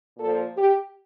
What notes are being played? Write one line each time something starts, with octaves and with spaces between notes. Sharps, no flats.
A#2 F3 A4
G4